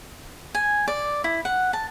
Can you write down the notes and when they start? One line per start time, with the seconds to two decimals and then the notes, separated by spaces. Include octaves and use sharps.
0.55 G#5
0.87 D5
1.24 E4
1.45 F#5
1.73 A5